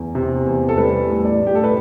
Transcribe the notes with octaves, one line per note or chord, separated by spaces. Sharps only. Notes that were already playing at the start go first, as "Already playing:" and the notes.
Already playing: E2
C3
E2
A4
G3 B4
A2
D5
A2
G4
A4
B4